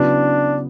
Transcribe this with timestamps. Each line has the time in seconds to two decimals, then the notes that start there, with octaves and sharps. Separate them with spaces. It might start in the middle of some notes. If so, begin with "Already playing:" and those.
Already playing: C#3 F#3 B3 D4 E4